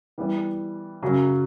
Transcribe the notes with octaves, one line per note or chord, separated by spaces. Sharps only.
E3 G3 B3
F#2 C#3 F#3